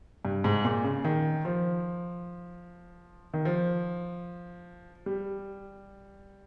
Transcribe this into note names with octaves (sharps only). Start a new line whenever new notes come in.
G2
G#2
A#2
C#3
D#3
F3
D#3
F3
G3